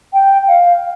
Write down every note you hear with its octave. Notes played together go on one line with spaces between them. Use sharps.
G5
F5